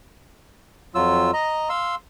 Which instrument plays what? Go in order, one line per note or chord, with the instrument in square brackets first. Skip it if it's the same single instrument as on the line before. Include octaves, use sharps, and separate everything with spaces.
[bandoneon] F2 F#3 F4 E6
D#5 A#5
F5 C6 E6